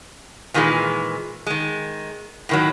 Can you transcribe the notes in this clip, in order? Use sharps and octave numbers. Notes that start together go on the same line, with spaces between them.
A#2 D#3 E3 F#3 G#3
D#3 G#3
A2 D#3 F#3